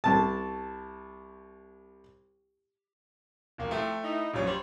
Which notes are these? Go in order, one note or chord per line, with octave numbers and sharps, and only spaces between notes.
C2 A5
E1 A#3
A2 F3 A3 C4 G5
D#4 E4
A#1 F#2 F3 G3 A#3 C#5
G3 C5 C#5